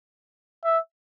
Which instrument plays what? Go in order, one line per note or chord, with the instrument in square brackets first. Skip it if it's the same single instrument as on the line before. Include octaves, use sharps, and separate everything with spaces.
[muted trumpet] E5